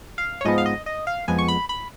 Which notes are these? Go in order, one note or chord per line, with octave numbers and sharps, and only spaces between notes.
F5
C#5
G#2 F3 G#3 B3 D#5
F5
D#5
D#5
F5
F2 F3 G#3 B3 G#5
C#6
B5
B5